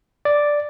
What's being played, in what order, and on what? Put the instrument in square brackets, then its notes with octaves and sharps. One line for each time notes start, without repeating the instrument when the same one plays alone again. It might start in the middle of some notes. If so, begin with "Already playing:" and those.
[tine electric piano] D5